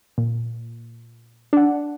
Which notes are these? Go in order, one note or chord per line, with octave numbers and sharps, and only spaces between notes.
A#2
D4 F#5